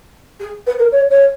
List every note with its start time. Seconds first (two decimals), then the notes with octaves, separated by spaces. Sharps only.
0.40 G#4
0.67 B4
0.79 A#4
0.92 C#5
1.10 C#5